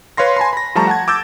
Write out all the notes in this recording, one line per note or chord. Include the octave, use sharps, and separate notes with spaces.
B4 C#5 F5 C6 A#6
G#5 A5 B5 C6
B5 A#6
F3 G3 A3 A5 A#5 C#6
F#5 A5 G#6
D6 E6 G6 A6